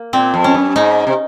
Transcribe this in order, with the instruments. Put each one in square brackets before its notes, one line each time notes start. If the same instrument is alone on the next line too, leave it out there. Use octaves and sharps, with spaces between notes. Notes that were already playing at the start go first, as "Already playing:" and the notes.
Already playing: [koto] A#3
[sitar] A#2 [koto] C4
[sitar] F2
[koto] C#4
[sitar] F#2
[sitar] G#2 [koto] D#4
[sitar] C3